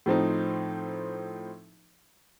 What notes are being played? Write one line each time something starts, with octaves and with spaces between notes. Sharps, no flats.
A2 F3 C4 D#4